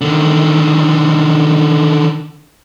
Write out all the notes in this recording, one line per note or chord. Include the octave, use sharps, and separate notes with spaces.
D3 D#3